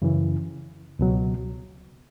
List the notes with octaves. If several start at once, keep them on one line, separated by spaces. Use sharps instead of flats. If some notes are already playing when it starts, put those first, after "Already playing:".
F#2 C#3 E3
C#2 B2 F#3